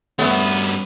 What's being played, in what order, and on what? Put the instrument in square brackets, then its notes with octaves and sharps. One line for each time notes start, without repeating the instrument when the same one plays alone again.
[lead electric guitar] G2 C#4 [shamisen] A3 E5 [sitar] B3